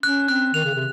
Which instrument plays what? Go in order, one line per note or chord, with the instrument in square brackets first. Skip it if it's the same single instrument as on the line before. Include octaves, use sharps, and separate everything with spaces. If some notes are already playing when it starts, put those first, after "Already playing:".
[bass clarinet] C#4 [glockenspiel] F#6
[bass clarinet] C4 [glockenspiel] F#6
[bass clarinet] D#3 [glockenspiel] F7
[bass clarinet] C#3
C3